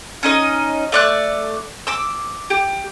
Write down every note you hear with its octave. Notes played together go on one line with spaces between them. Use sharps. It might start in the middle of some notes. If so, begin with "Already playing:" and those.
C#4 D#4 D#5
A3 D5 F#6
D6 E6
G4